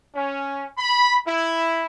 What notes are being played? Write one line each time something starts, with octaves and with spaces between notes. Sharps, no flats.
C#4
B5
E4